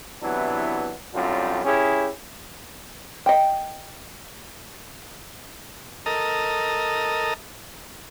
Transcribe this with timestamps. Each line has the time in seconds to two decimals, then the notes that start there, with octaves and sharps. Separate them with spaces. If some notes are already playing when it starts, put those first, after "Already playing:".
0.22 C3 E3 F#3 B3 D4 E4
1.14 F#2 A2 G3 C4 D4 F4
1.65 C#4 E4 G4 G#4
3.26 D#5 G5
6.06 A4 A#4 D#5